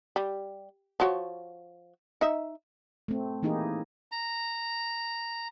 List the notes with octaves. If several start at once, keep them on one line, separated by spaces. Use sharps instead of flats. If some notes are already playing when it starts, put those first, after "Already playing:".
G3
F3 F#4 C#5
D#4 E5
A3 C4
E3 A#3 D#4 E4 G4 G#4
A#5